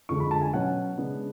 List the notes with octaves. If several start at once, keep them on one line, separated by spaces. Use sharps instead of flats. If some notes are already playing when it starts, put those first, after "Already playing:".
F2 D3 G#3 C#6
B5
A5
G#5
B2 F#3 C#4 F#5
C#3 G#3 B3 D4